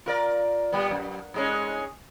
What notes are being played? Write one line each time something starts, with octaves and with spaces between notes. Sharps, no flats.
F4 A#4 D5
A#2 G3 B3
F#2
G#2 G#3 C#4